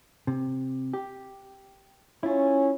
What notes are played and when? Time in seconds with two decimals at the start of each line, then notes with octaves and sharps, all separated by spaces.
0.27 C3
0.93 G4
2.23 C#4 E4 F4